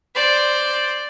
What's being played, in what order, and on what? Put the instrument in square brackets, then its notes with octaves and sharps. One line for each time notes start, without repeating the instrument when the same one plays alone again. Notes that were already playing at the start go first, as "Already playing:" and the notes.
[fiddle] C5 D5